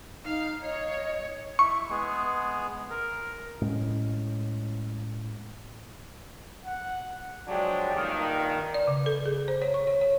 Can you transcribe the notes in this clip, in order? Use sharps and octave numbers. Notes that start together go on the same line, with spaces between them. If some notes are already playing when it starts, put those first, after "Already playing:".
D#4 F5
C#5 D#5
E4 C#6
G#3 B3 G#4
A#4
A2 G#3 C#4
F#5
F3 F#3 G#3 D4 G4
G2 A#2 D#3
D5
C#3
A4
G#4
C5
C#5
C#6
C#5
C#5